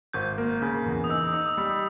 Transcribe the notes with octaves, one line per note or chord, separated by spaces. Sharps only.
G#1 G6
A#3
C#3
E2
D#6
D#4 E6
E6
D#4 D#6
D#6
G3 D#6